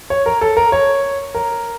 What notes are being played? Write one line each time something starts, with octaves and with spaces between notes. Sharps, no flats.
C#5
A#4
A4
A#4
C#5
A#4